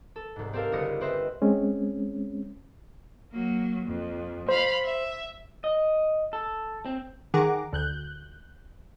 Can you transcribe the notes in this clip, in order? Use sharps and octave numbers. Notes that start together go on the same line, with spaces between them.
A4
C2 G#2
C4 G4 A4 A#4 F5
G1 C#2 C5 D#6 A#6 C#7
C4 B4 C5 D#5 E5
G#3 C4 C#4
F#3 A#3
F2
C5 F5 B5
E5
D#5
A4
C4
D#3 G#4 F#5 A#5 D6
D2 F#6 G6